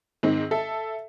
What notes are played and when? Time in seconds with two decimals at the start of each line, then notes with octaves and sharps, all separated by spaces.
0.23 G#2 D#3 C4 D#4
0.51 A4 E5